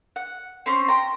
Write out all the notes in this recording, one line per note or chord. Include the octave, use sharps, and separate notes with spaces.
F#5
C4 C#4 C6
G5 A#5